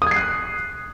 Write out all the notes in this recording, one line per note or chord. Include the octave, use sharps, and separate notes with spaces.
D#6 F#6 G#6 C7